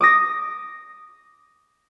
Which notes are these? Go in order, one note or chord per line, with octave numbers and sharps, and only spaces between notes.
D6 D#6 A#6